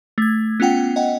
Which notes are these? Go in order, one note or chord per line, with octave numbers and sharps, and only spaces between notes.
A3 G#6
B3 C#4 F4 F#5 G5
D#5 F#5 G5